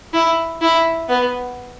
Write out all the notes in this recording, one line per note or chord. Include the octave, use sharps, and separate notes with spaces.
E4
E4
B3